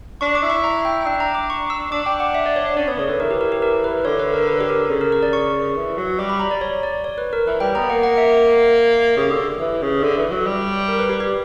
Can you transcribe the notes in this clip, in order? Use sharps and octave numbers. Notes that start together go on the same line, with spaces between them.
D4 C#6
D6
E4
C#6
A#5
G5
D4 G5
A#5
D6
C#6
E6
D4 D6
G5
F#5
E5
D5
C#5
C#4 D5
B3 C#5
C#3 C#5
D3 B4
E3 A#4
G4
A#4
G4
A#4
B4
D3 C#5
B4
A#4
B4
G4
A#4
C#3
A#4
A#4
D5
C#6
E3
F#3
G3 D6
B5
A#5
D5
C#5
D5
C#5
B4
A#4
E3 B4
G3 G5
B3 A#5
A#3 F#5
F#5
E5
C#3 G4
D3
E3
C#3
D3
E3
F#3
G3
A#4
B4
G4
G4